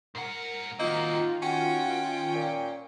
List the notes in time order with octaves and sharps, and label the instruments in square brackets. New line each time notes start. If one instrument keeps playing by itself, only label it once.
[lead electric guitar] G#2 F#5 [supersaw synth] A#4
[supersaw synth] D#3 F4 [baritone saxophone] A#3 [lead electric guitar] C4 F#4 [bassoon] D#4
[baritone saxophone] C#4 [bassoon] F#4 [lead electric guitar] G5
[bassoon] A#2